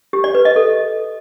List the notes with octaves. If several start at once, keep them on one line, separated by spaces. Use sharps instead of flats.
G4
D5
B4
D#5
A4